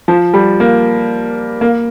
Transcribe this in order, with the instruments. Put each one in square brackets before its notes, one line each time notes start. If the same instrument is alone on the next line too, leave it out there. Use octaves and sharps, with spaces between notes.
[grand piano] F3
G3
A#3
A#3